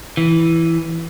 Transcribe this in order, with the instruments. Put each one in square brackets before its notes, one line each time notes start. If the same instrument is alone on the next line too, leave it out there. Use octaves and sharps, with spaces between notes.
[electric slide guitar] E3